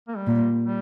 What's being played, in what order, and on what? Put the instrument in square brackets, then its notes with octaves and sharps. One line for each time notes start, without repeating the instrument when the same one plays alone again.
[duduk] A#3
G3
[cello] A#2
[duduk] G3